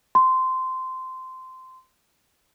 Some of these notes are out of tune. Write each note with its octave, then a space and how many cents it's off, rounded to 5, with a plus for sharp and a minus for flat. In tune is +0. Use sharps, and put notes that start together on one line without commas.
C6 -15